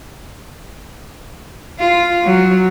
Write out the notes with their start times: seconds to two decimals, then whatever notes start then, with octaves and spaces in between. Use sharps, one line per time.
1.79 F4
2.23 F#3